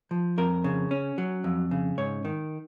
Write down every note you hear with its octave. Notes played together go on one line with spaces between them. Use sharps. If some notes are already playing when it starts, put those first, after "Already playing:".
F3
F2 A#4
C#3
C#4
F#3
F2
C#3
G#2 C#5
D#3